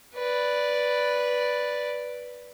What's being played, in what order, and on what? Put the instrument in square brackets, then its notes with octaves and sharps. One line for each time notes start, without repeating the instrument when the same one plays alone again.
[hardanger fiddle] B4 D5